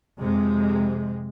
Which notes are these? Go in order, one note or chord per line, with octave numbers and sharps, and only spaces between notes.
F2 C3 G#3